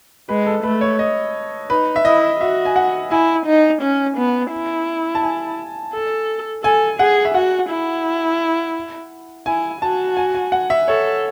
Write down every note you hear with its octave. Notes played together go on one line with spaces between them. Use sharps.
G#3 B4
A4
A3 B4
C#5
D#5
D#4 B4
E5
E4 D#5
F#4 E5
G#5
F#5
E4 G#5
D#4
C#4
B3
E4
A5
G#5
A4
A4 G#5
G#4 F#5
E5
F#4 F#5
E4
E4 G#5
F#4 A5
G#5
G#5
F#5
E5
A4 C#5